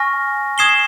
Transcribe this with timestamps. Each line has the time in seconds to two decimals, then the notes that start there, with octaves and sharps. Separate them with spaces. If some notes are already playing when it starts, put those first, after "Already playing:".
Already playing: G#5 C#6 F6 A#6
0.58 D#6 G#6 C7 E7 G7